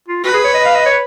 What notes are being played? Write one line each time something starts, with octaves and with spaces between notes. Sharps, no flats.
F4
F#4 B4
G#4
C#5
D#5
F5
D#5
C#5